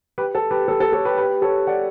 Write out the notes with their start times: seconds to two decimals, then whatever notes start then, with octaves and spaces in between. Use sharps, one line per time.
0.18 G4 B4
0.35 A4
0.51 G4 B4
0.68 A4
0.80 A4
0.93 A4 C#5
1.05 G4 B4
1.18 G4 B4
1.42 A4 C#5
1.67 D5 F#5